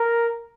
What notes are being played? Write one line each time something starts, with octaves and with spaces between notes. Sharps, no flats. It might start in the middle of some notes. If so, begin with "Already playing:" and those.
Already playing: A#4